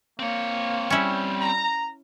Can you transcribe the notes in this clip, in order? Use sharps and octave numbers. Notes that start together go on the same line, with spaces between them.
A#3 C4 C#5
G3 C#4 E4
A#5